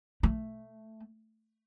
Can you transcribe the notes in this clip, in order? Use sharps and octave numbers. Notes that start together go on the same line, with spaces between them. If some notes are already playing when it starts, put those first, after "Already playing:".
A3